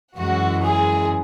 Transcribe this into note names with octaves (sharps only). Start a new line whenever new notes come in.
F#2 E3 G#3 F#4
G#4